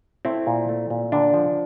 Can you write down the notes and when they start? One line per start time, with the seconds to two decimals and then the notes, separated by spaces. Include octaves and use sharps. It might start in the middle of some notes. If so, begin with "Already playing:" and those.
0.25 A3 C4 E4
0.47 A#2
0.69 A3
0.90 A#2
1.12 D3 D4
1.34 F3